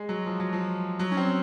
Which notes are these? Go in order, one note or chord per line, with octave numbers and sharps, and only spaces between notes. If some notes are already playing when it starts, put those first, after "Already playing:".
Already playing: G#3
F#3
F3
F#3
F3
F#3
C#4
C4